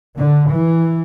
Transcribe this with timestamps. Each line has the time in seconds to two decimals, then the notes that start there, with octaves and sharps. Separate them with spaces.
0.17 D3
0.50 E3